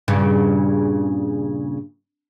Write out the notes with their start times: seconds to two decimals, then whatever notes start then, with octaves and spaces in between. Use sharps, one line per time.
0.08 G2 A#2 C#3